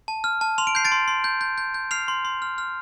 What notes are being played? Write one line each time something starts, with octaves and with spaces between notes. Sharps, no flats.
A5
F6
A5
C6 F7
D7
G6 C7
A6 D7
C6
C6
G6
G6
G6
G6
F6 C7 F7
C6
C6
F6
F6